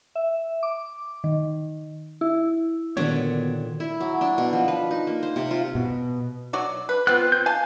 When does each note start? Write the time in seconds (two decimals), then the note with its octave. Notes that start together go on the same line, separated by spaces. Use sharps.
0.15 E5
0.63 D6
1.24 D#3
2.21 E4
2.97 A#2 D3 D#3 B3 F#4 C#5
3.80 E4
4.00 F#3
4.21 D4
4.38 B2
4.53 F3
4.68 B4
4.91 D#4
5.07 A#3
5.23 C5
5.36 C3
5.51 F4
5.75 B2
6.53 F#3 F#4 D5
6.89 B4
7.07 B3 C4 F4 F#6
7.32 G6
7.46 F5 G#5 A5